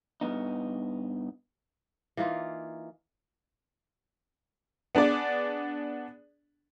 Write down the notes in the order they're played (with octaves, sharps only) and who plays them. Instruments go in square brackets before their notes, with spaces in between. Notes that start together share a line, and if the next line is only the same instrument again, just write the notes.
[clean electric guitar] G2 B3 D#4
[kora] E3 A#3 D#4 F4
[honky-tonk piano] B3 D4 G#4 D5